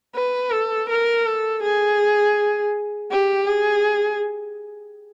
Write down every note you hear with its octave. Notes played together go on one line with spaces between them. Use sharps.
B4
A4
A#4
A4
G#4
G4
G#4